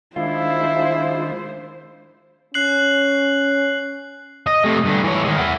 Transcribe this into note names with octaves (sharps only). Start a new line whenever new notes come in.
D#3 G#3 D4 E4 F4 C5
C#4 F#6 C7 F#7
D#5
C3 A3
G2 D3
E3 C#5
D#3 G#3
E4 F#5